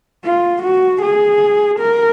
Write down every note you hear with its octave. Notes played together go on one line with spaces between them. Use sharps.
F4
F#4
G#4
A#4